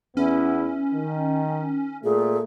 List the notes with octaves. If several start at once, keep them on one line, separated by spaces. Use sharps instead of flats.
E2 B3 C#4 E4
D#3
A#2 A3 G#4